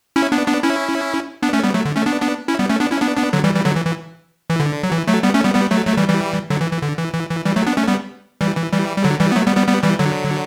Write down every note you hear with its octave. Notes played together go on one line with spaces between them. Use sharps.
C#4 E4
B3 D4
B3 D4
C#4 E4
B3 D4
A3 C#4
G3 B3
F#3 A3
D3
A3 C#4
B3 D4
B3 D4
C#4 E4
G3 B3
A3 C#4
B3 D4
C#4 E4
B3 D4
B3 D4
D3 F#3
E3 G3
E3 G3
D3 F#3
E3
E3
E3
D3
F#3
E3
F#3 A3
G3 B3
A3 C#4
G3 B3
G3 B3
F#3 A3
F#3 A3
E3 G3
E3 G3
D3 F#3
E3
E3
D3
E3
E3
E3
E3 G3
F#3 A3
B3 D4
A3 C#4
G3 B3
E3 G3
E3
E3 G3
G3
D3 F#3
E3 G3
B3
F#3 A3
G3 B3
G3 B3
G3 B3
E3 G3
D3 F#3